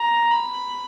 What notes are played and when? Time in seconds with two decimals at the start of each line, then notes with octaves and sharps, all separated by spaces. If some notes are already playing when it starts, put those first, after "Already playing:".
Already playing: A#5
0.31 B5